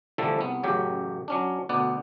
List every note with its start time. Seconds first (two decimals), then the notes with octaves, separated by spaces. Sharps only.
0.18 D3 E3 F3 G3 A3 A4
0.39 C2 B3
0.63 A1 F#2 C#3 F#3 G4
1.28 F#3 C#4 D4
1.69 D2 B2 B3 D5 F#5